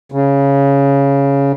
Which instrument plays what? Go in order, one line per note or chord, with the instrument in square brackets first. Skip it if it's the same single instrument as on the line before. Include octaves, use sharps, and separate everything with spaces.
[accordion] C#3